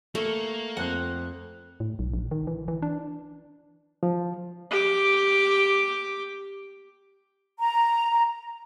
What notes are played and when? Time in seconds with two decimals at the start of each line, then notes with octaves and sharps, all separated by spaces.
0.15 A3 A#3 C#6
0.77 F2 C4 F#5
1.80 A2
1.99 B1
2.14 A#1
2.31 D#3
2.47 E3
2.68 E3
2.82 D4
4.03 F3
4.71 G4 D6
7.58 A#5